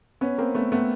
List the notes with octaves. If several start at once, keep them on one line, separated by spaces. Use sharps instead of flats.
B3 C#4
A#3 C4
A3 B3
A3 B3